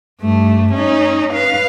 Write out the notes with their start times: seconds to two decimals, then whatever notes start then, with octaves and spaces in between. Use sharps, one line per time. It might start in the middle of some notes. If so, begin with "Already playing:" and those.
0.21 G2 A3
0.73 C#4 D#4
1.33 B4 F5